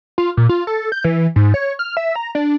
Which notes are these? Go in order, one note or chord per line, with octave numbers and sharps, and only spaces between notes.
F4
A#2
F4
A4
G6
E3
G#2
C#5
F6
E5
A#5
D4